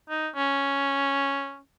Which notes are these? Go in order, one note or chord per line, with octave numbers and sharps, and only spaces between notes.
D#4
C#4